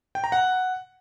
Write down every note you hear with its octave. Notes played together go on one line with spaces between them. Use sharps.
G5
A#5
F#5